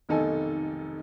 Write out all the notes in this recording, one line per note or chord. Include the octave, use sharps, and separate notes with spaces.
F1 B1 D#3 D#4 A4 G#5